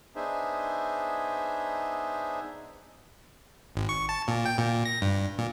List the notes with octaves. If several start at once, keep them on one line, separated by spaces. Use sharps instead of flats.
B3 D4 D#4 G#4 C5 E5
G#1
C#6
A5
A#2
G5
A#2
A#6
G2
A#2